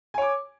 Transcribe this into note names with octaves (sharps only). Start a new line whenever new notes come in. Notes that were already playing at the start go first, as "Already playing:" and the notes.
C#5 G#5 D6